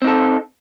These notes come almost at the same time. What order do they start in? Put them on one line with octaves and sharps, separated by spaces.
C4 D#4 A4